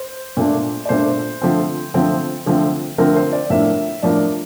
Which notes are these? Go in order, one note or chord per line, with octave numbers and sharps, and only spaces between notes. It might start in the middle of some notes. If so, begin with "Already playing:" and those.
Already playing: C5
A#2 A3 D4
D5
A#2 A3 D4 C5
D3 F3 A3 C4
D3 F3 A3 C4
D3 F3 A3 C4
D3 F3 A3 C4 A#4
C5
D5
A2 F3 A#3 D4 E5
A2 F3 A#3 D4 D5